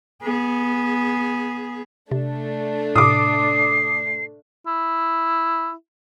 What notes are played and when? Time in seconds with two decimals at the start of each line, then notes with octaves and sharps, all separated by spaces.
0.22 B3 G#4
2.11 C3 A3 D4
2.96 A2 C3 D6 D#6 C7
4.67 E4